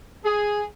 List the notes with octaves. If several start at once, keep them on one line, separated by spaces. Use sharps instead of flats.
G#4